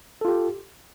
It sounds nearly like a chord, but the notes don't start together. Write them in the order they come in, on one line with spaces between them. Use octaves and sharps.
A4 F4 G4